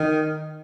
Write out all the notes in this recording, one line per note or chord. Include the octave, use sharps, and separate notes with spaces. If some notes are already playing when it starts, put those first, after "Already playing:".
Already playing: D#3